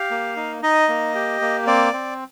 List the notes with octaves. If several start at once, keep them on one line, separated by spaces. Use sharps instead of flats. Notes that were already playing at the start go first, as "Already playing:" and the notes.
Already playing: G4 F5
A#3
D#4
D#4 D#5
A#3
G4
A#3
C4 D5
C4